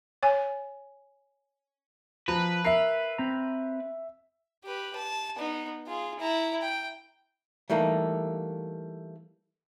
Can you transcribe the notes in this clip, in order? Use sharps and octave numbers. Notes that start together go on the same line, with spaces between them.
C#5 G#5
F3 B4 A#5
A#4 E5 A#5 C7
C4 A#5
G4 B4
A5
B3 D#4
F4 G#4
E4 A#5
G5
E3 G3 A3 A#3 D#4